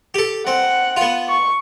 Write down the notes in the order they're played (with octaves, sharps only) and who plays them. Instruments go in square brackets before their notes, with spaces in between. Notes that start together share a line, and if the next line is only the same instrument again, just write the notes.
[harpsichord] G4 A4
[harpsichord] C4 [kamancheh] F#5
[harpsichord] B3 F4
[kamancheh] C#6